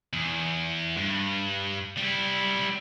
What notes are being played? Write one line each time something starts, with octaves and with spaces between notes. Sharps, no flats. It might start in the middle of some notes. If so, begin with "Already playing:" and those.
E2
G2
G3 E4